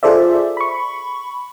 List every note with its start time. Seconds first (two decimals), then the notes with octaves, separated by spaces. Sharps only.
0.03 F4 G#4 A4 C5 D5 E5
0.57 B5 C#6